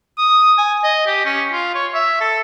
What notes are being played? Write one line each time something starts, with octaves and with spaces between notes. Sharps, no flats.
D#6
G#5
D#5
G4
C#4
F4
C#5
E5
A4